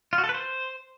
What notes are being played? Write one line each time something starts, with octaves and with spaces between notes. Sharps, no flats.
F4
F#4
A4
B4
C5